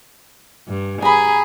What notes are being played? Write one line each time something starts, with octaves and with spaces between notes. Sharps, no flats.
G2
G#4 A#5 B5